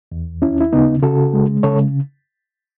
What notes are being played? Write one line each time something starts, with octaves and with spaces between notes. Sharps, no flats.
E2
D#2 C#4 E4
E4
C#3 B3 D#4
C#3 F#4 A4
G#3
C#3 A4 C#5